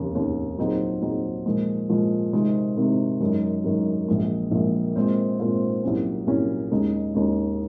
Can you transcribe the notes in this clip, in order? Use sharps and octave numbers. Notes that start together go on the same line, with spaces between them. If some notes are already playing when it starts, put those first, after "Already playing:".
Already playing: F1 D#2 C#3
F1 D#2 C#3
A#2 F#3 C4 D#4 G#4
A#2 F#3 C4 D#4 G#4
A#2 F3 G#3
A#2 F3 G#3
C3 D#3 G#3 C4
C3 D#3 G#3 C4
F#2 D#3 G#3
F#2 D#3 G#3
A#1 A#2 G#3
A#1 A#2 G#3
A#2 G#3 C4 F4 C5
A#2 G#3 C4 F4 C5
C2 A#2 F#3 C#4
C2 A#2 F#3 C#4
D#2 C#3 G#3 D#4
D#2 C#3 G#3 D#4